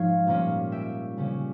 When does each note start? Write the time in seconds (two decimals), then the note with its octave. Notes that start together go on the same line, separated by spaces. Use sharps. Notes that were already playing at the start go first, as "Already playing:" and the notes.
Already playing: G#2 F3 G#3 C#5 F5
0.27 A#2 G3 A#3 C#4
0.72 E5 G5
1.18 C#3 G3 C#4